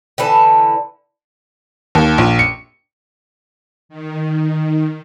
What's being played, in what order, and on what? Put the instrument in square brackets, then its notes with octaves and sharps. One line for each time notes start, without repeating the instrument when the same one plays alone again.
[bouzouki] D3 E3 B4 A5
[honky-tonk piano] D#2
A#1
C#7
[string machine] D#3